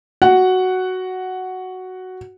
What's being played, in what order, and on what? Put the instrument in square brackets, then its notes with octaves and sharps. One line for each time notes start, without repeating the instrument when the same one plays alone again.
[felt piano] F#4 F#5